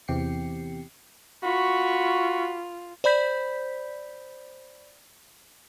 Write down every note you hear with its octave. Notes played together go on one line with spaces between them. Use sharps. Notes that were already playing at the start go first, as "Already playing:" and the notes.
E2 C3 G4 G5 C7 C#7
F4 F#4 B5 C#6
C5 D5 B5 G6 B6